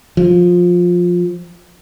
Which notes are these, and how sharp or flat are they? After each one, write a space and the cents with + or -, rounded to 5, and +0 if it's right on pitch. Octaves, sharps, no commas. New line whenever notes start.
F3 +15